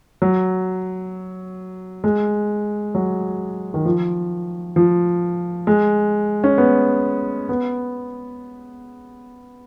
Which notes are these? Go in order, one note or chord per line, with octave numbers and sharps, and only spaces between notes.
F#3
G#3
F#3
D#3
F3
F3
G#3
C#4
B3
B3